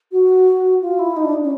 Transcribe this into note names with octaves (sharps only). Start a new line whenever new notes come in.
F#4
F4
E4
D#4
D4
C#4